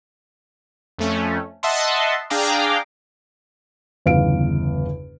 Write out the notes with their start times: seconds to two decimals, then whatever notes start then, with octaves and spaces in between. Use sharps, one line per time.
0.98 F2 A3 C#4
1.63 D#5 E5 F#5 A5 C6
2.30 D4 G#4 F5 G5 A#5 D6
4.06 G1 E2 C#3 F5 D7